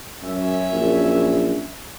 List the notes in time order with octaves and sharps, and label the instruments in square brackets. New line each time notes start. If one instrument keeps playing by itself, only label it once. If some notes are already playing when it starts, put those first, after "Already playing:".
[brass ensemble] F#2 C#4 E5
[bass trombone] A#1